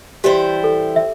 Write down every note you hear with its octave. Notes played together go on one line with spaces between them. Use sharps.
E3 G3 E4 G4 C5
A4
E5